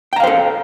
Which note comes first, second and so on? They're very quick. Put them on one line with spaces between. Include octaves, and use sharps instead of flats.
G5 A#5 F5 C5 A4